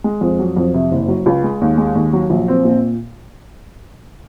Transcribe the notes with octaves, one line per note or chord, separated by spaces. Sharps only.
G#3
F2
F#3
F2
C3
F#1
F#3
C#2
G#3
D#2
G#3
D#2
F#3
A#1
C4
A#2